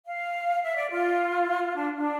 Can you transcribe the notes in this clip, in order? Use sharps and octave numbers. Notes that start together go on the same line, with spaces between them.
F5
E5
D5
F4
D4
D4